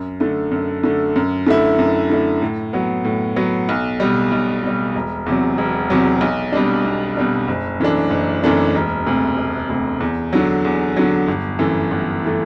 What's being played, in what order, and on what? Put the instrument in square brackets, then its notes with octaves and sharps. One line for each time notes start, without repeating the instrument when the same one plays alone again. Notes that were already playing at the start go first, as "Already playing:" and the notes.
Already playing: [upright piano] F#2
D3 A3
F#2
D3 A3
F#2
D3 A3 E4
F#2
D3 A3 E4
A2
F#3 B3
A2
F#3 B3
B1
B2 G3
B1
B2 G3
E1
E2 C3 F#3
E1
E2 C3 F#3
B1
B2 G3 D4
B1
B2 G3 D4
F#1
F#2 E3 A3 D4
F#1
F#2 E3 A3 D4
E1
D2 C3
E1
D2 C3
E2
D3 F#3
E2
D3 F#3
G1
F#2 E3 A3
G1
E3 A3